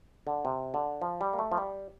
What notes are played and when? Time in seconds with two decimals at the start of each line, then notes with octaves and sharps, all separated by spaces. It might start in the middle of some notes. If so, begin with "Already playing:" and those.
0.27 D3
0.45 C3
0.74 D3
1.02 F3
1.21 G3
1.33 A#3
1.39 A3
1.52 F3
1.58 G3